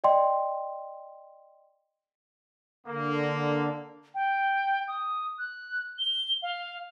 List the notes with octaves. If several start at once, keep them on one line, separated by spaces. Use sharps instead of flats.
D5 D#5 G5 C6
D3 A#3
G5
D#6
F#6
G7
F5